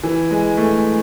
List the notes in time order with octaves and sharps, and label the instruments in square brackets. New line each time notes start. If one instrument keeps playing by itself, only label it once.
[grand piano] E3
G#3
A3